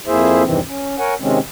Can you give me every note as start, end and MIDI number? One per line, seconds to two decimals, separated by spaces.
0.07 0.43 41
0.07 0.43 58
0.07 0.43 64
0.07 0.43 68
0.07 0.43 72
0.07 0.43 76
0.43 0.60 40
0.43 0.60 43
0.43 0.60 48
0.43 0.60 51
0.43 0.60 52
0.43 0.60 60
0.67 0.96 61
0.98 1.14 70
0.98 1.14 73
0.98 1.14 78
0.98 1.14 80
1.20 1.39 48
1.20 1.39 51
1.20 1.39 56
1.20 1.39 60
1.20 1.39 61